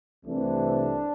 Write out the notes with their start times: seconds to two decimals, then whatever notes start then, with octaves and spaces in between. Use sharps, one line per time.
0.25 C2 C3 E3 A3 C4 D4